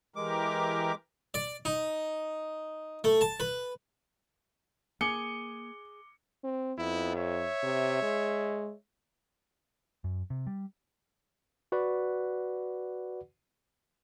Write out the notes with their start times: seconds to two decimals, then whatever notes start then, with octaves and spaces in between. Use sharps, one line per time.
0.16 E3 G#3 G4 A#4 D6
1.34 D5
1.65 D#4
3.04 A3
3.21 A5
3.40 B4
5.01 A#3 G#4 D6 C#7 G7
6.44 C4
6.79 F2 B3 E4
7.16 C#5 E5
7.63 C3
8.02 G#3
10.04 F#2
10.30 C3
10.47 G3
11.72 F#4 B4 D5 F#5